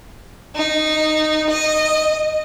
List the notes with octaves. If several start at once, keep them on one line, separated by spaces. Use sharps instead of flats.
D#4
D#5